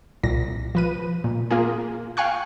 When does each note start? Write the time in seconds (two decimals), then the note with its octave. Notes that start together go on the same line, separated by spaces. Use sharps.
0.23 C2 A#2 A#6
0.75 F3 B4 D#7
1.24 A#2
1.51 A#3 F4 G#4
2.17 F5 G5 G#5 C#6 F#6